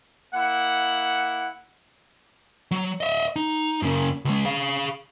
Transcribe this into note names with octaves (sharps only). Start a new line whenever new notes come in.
A#3 E4 F#5
F#3
D#5 E5
D#4
F#2 C#3
C#2 G#3
G#4 F5